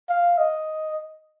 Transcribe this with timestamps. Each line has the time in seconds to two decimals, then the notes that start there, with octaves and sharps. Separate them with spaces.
0.09 F5
0.38 D#5